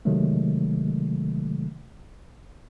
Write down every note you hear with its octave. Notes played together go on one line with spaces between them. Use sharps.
C3 D#3 F#3 G#3 A3